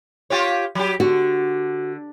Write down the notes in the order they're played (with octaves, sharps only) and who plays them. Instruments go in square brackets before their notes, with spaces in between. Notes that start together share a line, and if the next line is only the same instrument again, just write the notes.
[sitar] F4 G4 C#5
F#3 G4
[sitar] D3 [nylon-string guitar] F#4